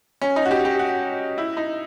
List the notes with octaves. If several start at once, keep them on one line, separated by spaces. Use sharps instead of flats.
C#4
D#4
F#4
G4
G4
F#4
E4
D#4